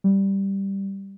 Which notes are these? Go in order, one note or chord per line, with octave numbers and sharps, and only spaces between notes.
G3